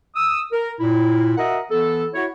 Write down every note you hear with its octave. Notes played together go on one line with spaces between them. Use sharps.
D#6 E6
A#4
A#2 E4
F#4 A#4 D#5 E5 F#5
E3 B3 A4
E4 F#4 C#5